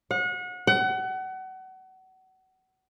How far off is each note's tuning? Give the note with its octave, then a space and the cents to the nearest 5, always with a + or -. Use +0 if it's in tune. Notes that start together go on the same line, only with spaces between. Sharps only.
F#5 -35
F#5 +30